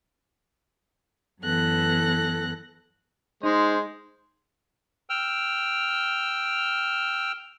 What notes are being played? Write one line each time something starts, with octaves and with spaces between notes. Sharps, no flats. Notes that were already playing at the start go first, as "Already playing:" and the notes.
F#2 E3 B3 A4 F#6 A#6
G#3 D#4 C5
G5 E6 F6